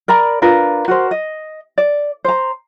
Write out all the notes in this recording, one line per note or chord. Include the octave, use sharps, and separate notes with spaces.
A#4 D5 A#5 B5
D4 F4 A#4 B4
F#4 A#4 C5
D#5
D5
C5 A#5